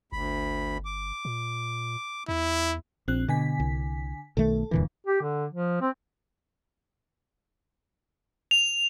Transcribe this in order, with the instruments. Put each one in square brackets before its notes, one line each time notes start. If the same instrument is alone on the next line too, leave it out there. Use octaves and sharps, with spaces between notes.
[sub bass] G1 [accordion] D2 B5
[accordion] D6
[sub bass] A#2
[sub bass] E2 [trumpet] E4
[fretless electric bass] A#1 [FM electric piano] C4 F#6
[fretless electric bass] B2 [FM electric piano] D3 G#5 B6
[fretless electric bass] C2
[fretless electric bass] B1 D#3 A3 [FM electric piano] A4
[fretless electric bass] D#1 A#2 E3 [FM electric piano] F2 D3
[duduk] G4
D3
F3
C4
[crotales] F7